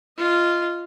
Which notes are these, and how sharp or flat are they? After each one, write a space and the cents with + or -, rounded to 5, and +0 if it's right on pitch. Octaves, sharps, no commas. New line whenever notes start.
F4 -10 D#5 +0